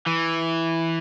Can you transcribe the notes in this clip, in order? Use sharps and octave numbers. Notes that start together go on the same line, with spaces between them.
E3